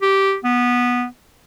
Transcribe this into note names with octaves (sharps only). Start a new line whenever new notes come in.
G4
B3